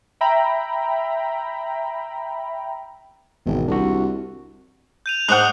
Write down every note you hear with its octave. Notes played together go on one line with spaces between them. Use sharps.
E5 G5 A#5 B5
G#1 E2 B2 D#3
C2 D4 F#4
G6 D#7 F7
G#2 C5 F#5 D#6 F#6 F#7